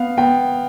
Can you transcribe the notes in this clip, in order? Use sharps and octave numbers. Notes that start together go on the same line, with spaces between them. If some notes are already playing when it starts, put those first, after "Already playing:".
Already playing: B3 F5
B3 G5